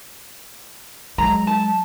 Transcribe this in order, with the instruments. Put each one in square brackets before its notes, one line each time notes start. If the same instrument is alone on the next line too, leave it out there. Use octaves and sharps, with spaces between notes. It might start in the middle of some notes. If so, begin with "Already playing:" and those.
[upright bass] F#3 G#3 [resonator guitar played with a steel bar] A#5
[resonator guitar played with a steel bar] A5